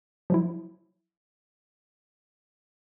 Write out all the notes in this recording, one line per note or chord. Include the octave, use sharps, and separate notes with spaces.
F3 F#3 E4